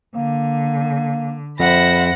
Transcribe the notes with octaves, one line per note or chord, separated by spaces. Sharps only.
D3 A#3
F2 C5 E5 F#5 B5 A#6